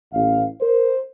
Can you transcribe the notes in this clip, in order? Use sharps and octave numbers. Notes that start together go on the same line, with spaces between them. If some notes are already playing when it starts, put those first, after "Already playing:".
A1 F5
A#4 C5